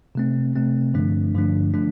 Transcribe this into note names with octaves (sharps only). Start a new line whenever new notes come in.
C3 A3 C4
C3 A3 C4
G2 D3 F3 A3 D4
G2 D3 F3 A3 D4
D3 F3 A3 D4